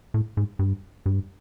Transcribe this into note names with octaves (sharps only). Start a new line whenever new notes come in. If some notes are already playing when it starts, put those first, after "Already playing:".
A2
G#2
G2
G2